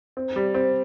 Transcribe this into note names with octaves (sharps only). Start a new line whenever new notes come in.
C4
G3
C4